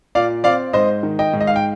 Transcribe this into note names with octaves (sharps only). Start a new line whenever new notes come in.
A#2 D5 F5
C4 D5 F5
G#2 C5 D#5
D#3
D#5 G5
G#2
D#5
F5
G5